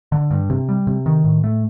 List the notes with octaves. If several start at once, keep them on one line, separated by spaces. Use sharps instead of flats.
D3
G2
C3
G3
C3
D#3
A2
A3